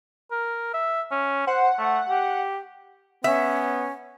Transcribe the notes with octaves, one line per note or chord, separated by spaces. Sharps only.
A#4
E5
C#4
C5 F#5
A3
G4
B3 C#4 E5